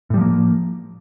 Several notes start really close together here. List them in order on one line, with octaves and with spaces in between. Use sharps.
A2 G3 F3 A#3